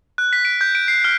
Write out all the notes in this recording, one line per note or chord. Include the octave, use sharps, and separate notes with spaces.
F#6
B6
D7
G6
D7
C7
F6